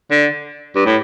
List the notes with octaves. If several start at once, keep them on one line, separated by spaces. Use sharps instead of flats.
D3
G2
A2